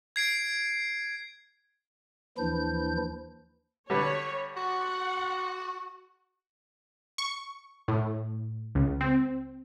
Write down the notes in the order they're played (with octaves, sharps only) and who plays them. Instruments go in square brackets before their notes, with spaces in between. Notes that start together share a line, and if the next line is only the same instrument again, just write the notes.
[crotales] G#6 C7 D7
[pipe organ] D#2 E3 F3 D4 E4 G6
[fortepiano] D3 G3 B4 [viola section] C#5
[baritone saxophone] F#4 [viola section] F#5
[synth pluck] C#6
A2
C#2
C4